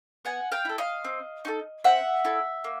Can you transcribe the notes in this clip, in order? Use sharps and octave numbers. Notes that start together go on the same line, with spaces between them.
B3 F#5 G#5
F5 G5
E4 A4
D#5 F5
C4
D#4 F#4 A4
C4 E5 F#5
E4 A4
A#3